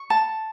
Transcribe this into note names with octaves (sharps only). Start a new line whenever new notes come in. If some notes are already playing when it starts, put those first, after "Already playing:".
Already playing: C#6
A5